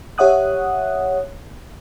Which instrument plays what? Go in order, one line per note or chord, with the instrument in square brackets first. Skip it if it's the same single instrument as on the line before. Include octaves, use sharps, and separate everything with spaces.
[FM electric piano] G4 C#5 E5 F#5 D#6 F#6